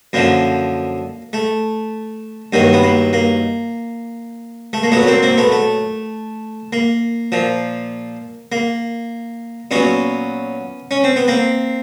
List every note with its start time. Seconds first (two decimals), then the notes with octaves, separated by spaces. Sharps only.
0.13 F#2 D3 F3 A#3
1.33 A3
2.53 G2 D#3 F#3 A#3
2.73 B3
2.84 A#3
3.13 A#3
4.73 A3
4.83 A#3
4.92 A#2 F#3 A3 B3
5.07 A#3 C4
5.23 A#3 C4
5.38 A3 B3
5.52 A3
6.73 A#3
7.32 A#2 F3
8.52 A#3
9.71 A#2 F#3 B3 C#4
10.91 C#4
11.04 C4
11.16 B3
11.28 A#3 C4